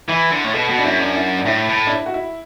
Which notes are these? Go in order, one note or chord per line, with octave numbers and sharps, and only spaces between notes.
E3 E4
D3
A2
B2 A4
B2 F#4
D4
F#2 E4
D4
E4
E4
D4
A2 E4
A2
D4
E4
F#4
E4